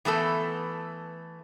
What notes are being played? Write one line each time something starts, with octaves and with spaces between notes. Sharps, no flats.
E3 A3 B3 A4